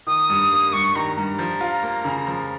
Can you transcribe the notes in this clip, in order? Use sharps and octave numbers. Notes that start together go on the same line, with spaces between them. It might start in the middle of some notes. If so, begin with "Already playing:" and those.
D#3 D#6
G2
A#3
G2 C#6
D#3 A#5
G2 A#5
F3
F4
A#3
C#3
F3